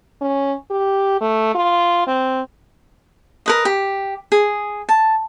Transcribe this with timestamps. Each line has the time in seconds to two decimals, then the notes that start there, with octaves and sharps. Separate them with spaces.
0.21 C#4
0.70 G4
1.21 A3
1.55 F4
2.07 C4
3.46 A#4 B4 D#5
3.65 G4
4.32 G#4
4.89 A5